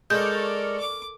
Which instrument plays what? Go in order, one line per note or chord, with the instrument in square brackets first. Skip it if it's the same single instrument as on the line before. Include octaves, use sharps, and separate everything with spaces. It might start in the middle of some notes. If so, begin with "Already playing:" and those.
[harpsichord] G#3 [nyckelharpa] A4 A#4 [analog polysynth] D5 C#6 F6 [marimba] G6
[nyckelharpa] D6